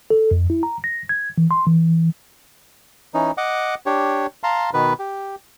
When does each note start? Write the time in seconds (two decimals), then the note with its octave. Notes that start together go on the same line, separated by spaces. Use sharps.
0.10 A4
0.31 F2
0.50 E4
0.63 A#5
0.84 A#6
1.09 G#6
1.38 E3
1.51 C6
1.67 E3
3.14 E3 C#4 D#4
3.37 D#5 F#5 D6
3.86 D4 G4 C#5
4.44 F5 A5 A#5 C6
4.74 B2 D#3 B3 B4
4.99 G4